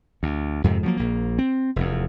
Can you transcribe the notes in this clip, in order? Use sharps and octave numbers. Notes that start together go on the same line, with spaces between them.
D2
F2 G#2 C3
F3 F#3 G#3 A#3
A#1 A#3
C4
F1 E2